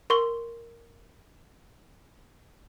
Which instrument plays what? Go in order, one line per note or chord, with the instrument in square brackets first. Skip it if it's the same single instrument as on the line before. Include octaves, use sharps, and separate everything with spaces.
[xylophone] A#4 C6 C#6 G7